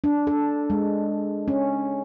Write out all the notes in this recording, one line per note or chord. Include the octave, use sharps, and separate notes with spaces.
D4
A4
G#3
C#4